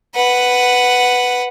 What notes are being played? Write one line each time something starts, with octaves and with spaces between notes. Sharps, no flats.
B4 F#5